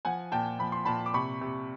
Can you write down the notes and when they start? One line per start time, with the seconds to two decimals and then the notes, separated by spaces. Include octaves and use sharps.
0.05 F3 F#5 G#5
0.32 A#2 G5 A5
0.59 F3 B5
0.72 C6
0.85 A#2 A5 B5
1.06 D6
1.14 C3 B5 C#6
1.41 C3